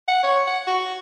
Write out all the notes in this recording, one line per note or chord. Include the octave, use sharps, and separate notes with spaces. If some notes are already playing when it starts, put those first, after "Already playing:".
F#5
C#5
F#5
F#4